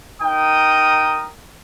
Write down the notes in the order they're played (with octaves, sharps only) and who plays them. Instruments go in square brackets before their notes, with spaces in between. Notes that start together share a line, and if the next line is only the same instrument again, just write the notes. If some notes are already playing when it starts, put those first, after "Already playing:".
[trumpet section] D#4 A#4 G5 D#6